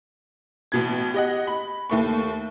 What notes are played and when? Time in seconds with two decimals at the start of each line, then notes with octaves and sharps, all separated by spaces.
0.72 A1 B2 G#6
1.14 G4 D#5 F#5
1.47 B5
1.90 D#2 A3 C#6